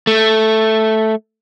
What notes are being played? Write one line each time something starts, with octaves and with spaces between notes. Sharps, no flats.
A3